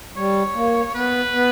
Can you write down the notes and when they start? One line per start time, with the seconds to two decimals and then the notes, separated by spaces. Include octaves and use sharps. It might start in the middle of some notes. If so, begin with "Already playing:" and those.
0.16 G3 C#5
0.55 A#3
0.94 B3 B4
1.33 B3